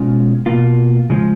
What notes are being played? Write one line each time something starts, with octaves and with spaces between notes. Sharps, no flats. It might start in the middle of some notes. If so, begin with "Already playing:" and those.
Already playing: B2 G#3 C#4 F4
B2 A#3 F4
C#3 F3 G#3